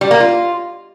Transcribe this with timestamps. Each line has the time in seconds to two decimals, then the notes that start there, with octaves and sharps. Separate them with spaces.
0.01 G3
0.11 A#3
0.20 F4